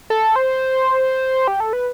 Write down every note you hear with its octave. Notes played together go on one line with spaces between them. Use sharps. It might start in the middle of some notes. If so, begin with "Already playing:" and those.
A4
C5
G4
A4
B4